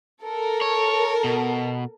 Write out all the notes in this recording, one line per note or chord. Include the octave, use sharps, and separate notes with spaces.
A4 A#4
C#5
B2